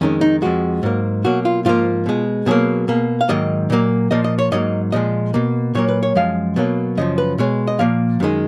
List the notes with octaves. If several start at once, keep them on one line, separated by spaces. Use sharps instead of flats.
F2 D#3 G#3 C#4
D#4
F2 F3 G#3 F#4
G#2 F#3 A#3
B2 F#3 A#3 F#4
F4
G#2 F3 A#3 F4
B2 G#3
B2 F#3 A#3 G#4
B2 A#3
F5
G#2 D#3 F#3 A#3 D#5
A#2 F#3 A#3
A#2 F3 A#3 D#5
D#5
C#5
G#2 F#3 A#3 D#5
A#2 F3 G#3 D#5
B2 A#3
A#2 F#3 A#3 C#5
B4
C#5
F#2 F3 G#3 F5
B2 F#3 A#3
F#2 C#3 F3 D#5
B4
B2 G#3 C#5
D#5
A#2 F3 A#3 F5
F#2 D#3 G#3